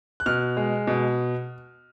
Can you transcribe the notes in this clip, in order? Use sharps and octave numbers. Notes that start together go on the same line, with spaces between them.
F#6
B2 F6
G#3
B2